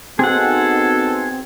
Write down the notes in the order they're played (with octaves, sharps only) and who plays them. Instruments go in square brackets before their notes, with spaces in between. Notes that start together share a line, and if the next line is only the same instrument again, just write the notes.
[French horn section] B3 D#4 F#4 [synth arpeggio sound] C4 [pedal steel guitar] G#4 F#5 [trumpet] A4